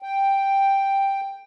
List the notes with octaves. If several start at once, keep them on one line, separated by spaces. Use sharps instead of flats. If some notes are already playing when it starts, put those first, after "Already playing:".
G5